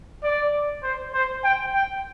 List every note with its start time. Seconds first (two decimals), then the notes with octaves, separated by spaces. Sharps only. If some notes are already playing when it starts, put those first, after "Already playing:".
0.23 D5
0.83 C5
1.14 C5
1.44 G5
1.74 G5